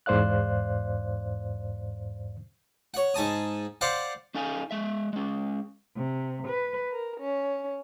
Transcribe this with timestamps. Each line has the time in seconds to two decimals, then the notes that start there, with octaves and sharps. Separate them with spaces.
0.06 E2 G#2 C5 D5 F5 F#6
2.94 C#5 F#5
3.14 G#2 G#5 A5 D#6
3.81 C5 D5 F5 F#5
4.34 C#4 D#4 A4 F5 G#5
4.71 G#3 E5
5.13 G#3 C#4
5.96 C3
6.47 B4
6.92 A#4
7.20 C#4